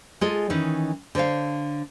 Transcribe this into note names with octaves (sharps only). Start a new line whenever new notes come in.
G#3 F4 G#4 A4 D#5
D#3 E3 C#4 D#4
D3 C5 C#5 F5